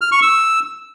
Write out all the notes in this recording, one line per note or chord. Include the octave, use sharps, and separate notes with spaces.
F6
C#6
E6